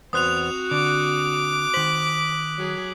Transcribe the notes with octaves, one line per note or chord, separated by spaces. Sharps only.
E2 B3 C4 F#4 C5 D#6 F#6 F7
D3 D6
D#3 C5 B6 F#7
F#3 G#4